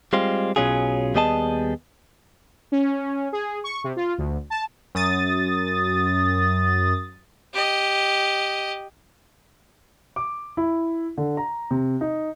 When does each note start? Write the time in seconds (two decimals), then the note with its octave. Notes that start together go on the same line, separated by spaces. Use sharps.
0.13 G3 G#3 C4 F4
0.56 B1 B2 F#3 C#4 F4 G#4
1.14 D#2 G3 B3 G#4 D#5 A5
2.72 C#4
3.33 G#4
3.64 C#6
3.84 C3
3.96 F4
4.18 D2
4.50 A5
4.95 F#2 D#6 A6
7.54 G4 D#5
10.16 D6
10.57 E4
11.17 D3
11.37 A#5
11.71 C3
12.01 D#4